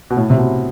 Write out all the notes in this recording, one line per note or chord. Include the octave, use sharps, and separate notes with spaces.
B2
A2
C3
B2